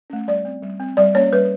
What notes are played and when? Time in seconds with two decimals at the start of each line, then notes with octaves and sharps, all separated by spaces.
0.10 A3 C#4
0.28 G3 D5
0.45 C4
0.62 G3
0.80 C4
0.97 G3 D5
1.14 A#3 C#4 C#5
1.32 G3 B4